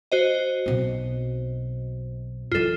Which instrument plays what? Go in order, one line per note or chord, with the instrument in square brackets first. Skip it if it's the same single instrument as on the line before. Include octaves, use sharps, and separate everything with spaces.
[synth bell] F#4 C5 D#5
[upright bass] B1 C4
[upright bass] F#2 E3 [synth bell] F4 A4